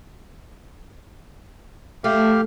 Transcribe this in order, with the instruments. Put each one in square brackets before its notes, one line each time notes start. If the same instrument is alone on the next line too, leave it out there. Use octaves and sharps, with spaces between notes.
[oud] A3 [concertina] G4 F5